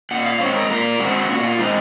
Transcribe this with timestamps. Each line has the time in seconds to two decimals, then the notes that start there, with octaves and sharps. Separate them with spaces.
0.11 A#2 F#5
0.25 F5
0.40 G#3 C4 C#5
0.56 A#4
0.70 A#2 A#4
0.99 G#3 C4 F#4
1.29 A#2 F#4
1.45 F4
1.59 G#3 C4 D#4